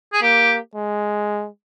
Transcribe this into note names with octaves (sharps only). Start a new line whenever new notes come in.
G#4
A#3 G4
G#3